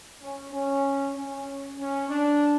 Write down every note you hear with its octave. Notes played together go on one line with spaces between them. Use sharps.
C#4
C#4
C#4
C#4
D4